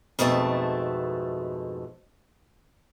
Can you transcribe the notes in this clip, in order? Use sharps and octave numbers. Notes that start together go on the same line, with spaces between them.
F2 G#2 B2 A3 A5